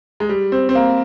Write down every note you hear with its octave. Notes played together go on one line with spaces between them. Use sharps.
G#3
G3
C4
C4
A#3